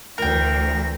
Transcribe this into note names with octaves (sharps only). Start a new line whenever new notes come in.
D2 E3 A#4 G5 A#6